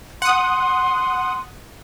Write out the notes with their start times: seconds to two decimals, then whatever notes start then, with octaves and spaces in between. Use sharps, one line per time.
0.22 F#5 C6 D#6